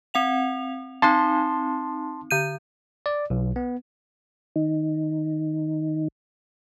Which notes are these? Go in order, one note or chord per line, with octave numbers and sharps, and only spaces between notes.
C4 F#5 F7
C4 D#4 A5 C6
D3 G6 D#7
D5
B1
B3
D#3 D#4